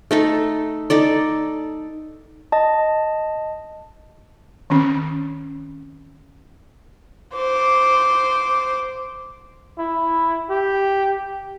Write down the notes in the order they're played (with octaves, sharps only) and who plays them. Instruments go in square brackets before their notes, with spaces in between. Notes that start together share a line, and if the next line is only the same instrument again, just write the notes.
[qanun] A3 D#4 A4
D#4 A4 D5
[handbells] D#5 A5
[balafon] D#3 C4 C#4
[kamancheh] C5 D6
[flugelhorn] E4
G4